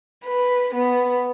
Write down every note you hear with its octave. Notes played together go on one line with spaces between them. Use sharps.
B4
B3